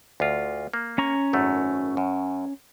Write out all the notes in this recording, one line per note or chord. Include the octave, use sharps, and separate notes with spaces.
D2 F4
A#3
C#4 A#5 C#6
G#1 F#2 A3
F#2